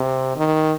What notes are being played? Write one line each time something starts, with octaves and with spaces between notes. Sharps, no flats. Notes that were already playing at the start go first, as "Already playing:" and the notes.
Already playing: C3
D#3